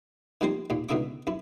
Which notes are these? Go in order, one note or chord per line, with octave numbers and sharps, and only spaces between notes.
D#3 F3 G3 A#3 C4 C5
D#2 A#2
C#2 B2 D3 D#4 E5 D6
F#2 E4